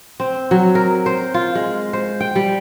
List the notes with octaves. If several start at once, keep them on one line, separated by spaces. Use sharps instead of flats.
C4
F#3
A#4
C5
F4
G#3
C5
G5
G3